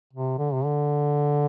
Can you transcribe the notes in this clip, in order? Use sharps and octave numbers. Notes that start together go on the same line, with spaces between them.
C3
D3
C3
D3